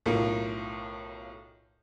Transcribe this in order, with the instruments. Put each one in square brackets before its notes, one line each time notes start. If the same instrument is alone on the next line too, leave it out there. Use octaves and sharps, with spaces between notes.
[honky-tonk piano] B1 A2 F4 A#4